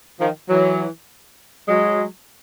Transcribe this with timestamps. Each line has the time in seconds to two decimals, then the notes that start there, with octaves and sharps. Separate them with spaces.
0.19 D#3 F3
0.48 E3 F#3
1.68 F#3 G#3